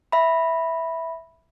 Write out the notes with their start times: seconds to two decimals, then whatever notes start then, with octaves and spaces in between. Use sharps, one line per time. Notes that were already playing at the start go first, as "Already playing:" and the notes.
0.12 E5 B5